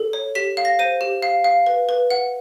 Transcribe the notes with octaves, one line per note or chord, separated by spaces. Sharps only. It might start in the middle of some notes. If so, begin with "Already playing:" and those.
Already playing: A4
C#5
G4 B6
F5
A#6
C5 D#7
G4
F5
F5
B4
B4
F#5